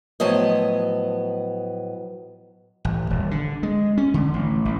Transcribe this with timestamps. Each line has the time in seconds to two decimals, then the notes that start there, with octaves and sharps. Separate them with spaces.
0.20 A2 F3 F#3 B3 D#5
2.85 A1
3.10 D#1
3.31 D3
3.63 G#3
3.98 C#4
4.14 D3
4.34 A1
4.65 A1